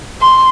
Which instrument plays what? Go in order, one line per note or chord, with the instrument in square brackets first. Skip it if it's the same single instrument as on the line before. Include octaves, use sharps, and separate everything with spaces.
[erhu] C6